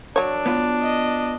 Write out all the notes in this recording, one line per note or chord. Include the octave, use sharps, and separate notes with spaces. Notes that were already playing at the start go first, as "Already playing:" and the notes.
F#3 D4 C#5
B3 F4
D#5